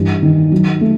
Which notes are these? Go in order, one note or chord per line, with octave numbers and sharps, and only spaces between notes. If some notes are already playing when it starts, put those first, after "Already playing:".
Already playing: G2 E3
D#3
F#3
A3